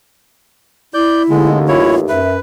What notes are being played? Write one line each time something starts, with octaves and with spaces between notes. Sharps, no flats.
E4 D5 G6
A1 D#2 D3 G#3
F#2 E4 F4 C#5
F#2 B4 E5